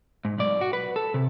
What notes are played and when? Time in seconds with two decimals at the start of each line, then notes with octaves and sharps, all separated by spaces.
0.25 G#2
0.38 B1 D5
0.61 F#4
0.73 B4
0.96 A4
1.14 C3